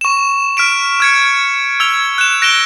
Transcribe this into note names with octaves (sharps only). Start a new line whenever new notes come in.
C#6 E7
F6 B6 D7 E7
F6 G#6 C#7
E6 G#6 F7
F#6 E7
F#6 A#6 D7 E7 G7